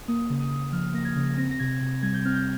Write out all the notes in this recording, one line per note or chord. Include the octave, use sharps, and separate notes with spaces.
A#3 D#6
C#3
D#6
C#3
F3 F6
A#3 A#6
G#6
C#3
C4 A#6
A#6
C3 G#6
C3
G3 G#6
G6
C4 F6
G6